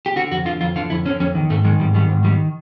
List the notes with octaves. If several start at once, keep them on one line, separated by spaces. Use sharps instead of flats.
G4
D3 F#4
F2 F#4
D3 F4
F2 F4
D3 F4
F2 E4
D3 C#4
F2 C#4
D#3
G#2 A3
D#3 G#3
G#2 G3
D#3 G3
G#2
D#3 G3